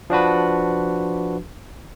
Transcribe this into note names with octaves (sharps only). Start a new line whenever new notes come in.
F3 D4 F#4 B4